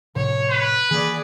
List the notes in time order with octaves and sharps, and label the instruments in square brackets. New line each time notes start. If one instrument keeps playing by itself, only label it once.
[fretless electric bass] A2 C3 F3 [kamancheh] C#5
[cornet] B4
[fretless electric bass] D#3 E3 A#3 [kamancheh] G#4 D5